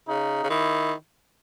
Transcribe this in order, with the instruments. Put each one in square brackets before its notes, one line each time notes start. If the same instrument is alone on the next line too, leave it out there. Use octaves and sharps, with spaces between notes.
[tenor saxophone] C#3 [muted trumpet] D#4
[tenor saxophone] C#3
[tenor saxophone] D#3 [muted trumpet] E4